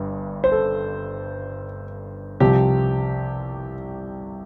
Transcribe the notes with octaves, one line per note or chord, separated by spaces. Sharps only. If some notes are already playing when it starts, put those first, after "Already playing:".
Already playing: G1 G2
C5
A4
C2 C3 F3 G4